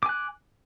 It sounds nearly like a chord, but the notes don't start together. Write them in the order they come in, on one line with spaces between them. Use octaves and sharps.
D6 G#5 F#6